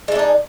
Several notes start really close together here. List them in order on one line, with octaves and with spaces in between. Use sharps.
G#3 A3 D4 D#4